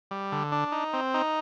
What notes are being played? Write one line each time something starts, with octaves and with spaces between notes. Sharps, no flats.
G3
D3
D4
D#4
C4
D#4